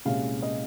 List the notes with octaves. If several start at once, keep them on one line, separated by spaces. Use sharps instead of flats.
C2 A#2 G#3 C#4 F5
D#5